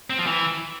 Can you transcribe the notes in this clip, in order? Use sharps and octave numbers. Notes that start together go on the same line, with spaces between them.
C4
F3
E3